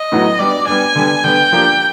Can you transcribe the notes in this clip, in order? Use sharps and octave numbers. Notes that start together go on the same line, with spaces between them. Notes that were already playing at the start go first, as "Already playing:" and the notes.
Already playing: D#5
A2 F#3 B3 D#4 F#4
G3 B3 D4 D5
G3 B3 D4 G#5
D3 G3 B3
D3 G3 B3 G5
F3 A#3 D4 G4